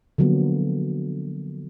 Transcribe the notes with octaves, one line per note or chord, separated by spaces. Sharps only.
D3 F3 F#3 A#3 B3